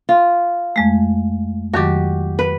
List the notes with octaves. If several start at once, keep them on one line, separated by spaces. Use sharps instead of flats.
F4
F2 G#3 A3
F2 D#3 F#3 F#4 G4
B4